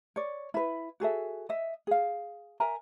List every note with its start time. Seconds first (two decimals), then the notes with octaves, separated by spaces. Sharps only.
0.16 C#5 D5
0.54 E4 B4
1.00 F#4 G#4 A4 E5
1.49 D#5 E5
1.87 G#4 F5
2.60 A#4 E5 G#5 A#5